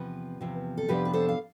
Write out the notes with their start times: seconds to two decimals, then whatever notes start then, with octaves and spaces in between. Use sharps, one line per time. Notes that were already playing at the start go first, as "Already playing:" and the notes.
Already playing: E2 C3 F3 B4
0.41 E2 C3 F3
0.77 A4
0.88 F2 C3 F3 B3 D4 G4 B4
1.05 B4
1.13 A4 C5
1.29 F5